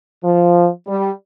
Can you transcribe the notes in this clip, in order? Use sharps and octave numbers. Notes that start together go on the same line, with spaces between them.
F3
G3